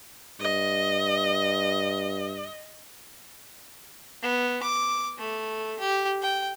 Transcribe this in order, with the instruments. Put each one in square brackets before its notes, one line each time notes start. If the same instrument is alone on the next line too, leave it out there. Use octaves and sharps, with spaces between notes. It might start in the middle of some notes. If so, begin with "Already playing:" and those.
[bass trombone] G2 [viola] D#5
[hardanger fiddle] B3
D6
A3
G4
G5